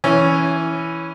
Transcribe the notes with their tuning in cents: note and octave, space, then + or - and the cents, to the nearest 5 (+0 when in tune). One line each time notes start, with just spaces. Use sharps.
E3 +0 C#4 +0